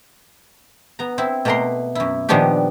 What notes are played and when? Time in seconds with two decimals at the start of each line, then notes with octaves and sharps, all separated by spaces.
0.99 B3 A#5
1.18 C4 E4
1.45 B2 A3 A#3 A#4 A#5 C6
1.95 F#2 E4
2.29 A#2 D#3 F3 B3 D4 G4